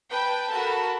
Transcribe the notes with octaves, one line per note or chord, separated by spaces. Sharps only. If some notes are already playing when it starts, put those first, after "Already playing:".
B4 G5 A5
F#4 A4 A#4 A5 B5